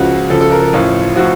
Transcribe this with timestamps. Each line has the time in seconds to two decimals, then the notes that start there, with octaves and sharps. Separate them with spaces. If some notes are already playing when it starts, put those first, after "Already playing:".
Already playing: C#2 C#3 F3 F#4
0.30 C#2 C#3 F3 A4
0.41 A4
0.52 A#4
0.62 A4
0.73 A1 A2 F3 F4
1.15 A2 F3 F#4